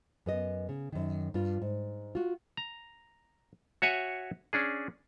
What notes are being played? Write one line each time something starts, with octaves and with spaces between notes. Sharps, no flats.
F#2 B3 D#5
C#3
F#2 D#3
G2 F4
G#2
F4 F#4
A#5
F#4 C#5 E5 F#5 G#5
C#4 D4 G#4